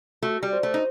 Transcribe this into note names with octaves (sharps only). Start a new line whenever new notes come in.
A3 F#4
G3
C5
A3
D#4